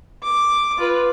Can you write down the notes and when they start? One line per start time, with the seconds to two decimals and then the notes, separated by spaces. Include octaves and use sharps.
0.23 D6
0.78 F4 B4